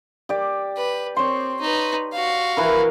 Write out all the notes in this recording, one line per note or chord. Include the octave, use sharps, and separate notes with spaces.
G4 D5
B4
C4 C#5 C6
D#4 B4
F#4 F5
E3 E4 A#4